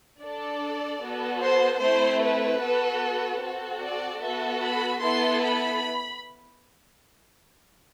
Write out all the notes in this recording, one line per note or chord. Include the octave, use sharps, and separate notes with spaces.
D4 A4 D5
B3 F#4 A4
C5
A3 C4 E4 C5
B4
B3 F#4 A4
C4 F#4 A4
D5
B3 F#4 A4 E5
B5
B3 E4 A4 C6
B5